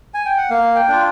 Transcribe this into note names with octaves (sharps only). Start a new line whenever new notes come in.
G#5
G5
F#5
A#3 F5
G5
D4 F4